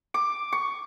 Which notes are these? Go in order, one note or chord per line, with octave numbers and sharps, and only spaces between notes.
D6
C#6